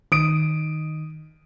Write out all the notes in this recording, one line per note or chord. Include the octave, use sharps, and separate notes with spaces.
D#3 D#6 D7